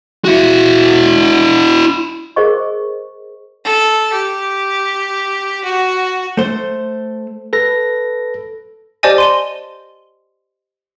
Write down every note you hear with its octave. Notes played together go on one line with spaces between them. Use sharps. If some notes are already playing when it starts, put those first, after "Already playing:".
E4 F#4
G#4 A#4 C5 D#5 C#6
A4
G4
F#4
A3 C5
A4 B4 A#6
G4 C5 D5 D#5 G#5 A5
C6 D#7 G7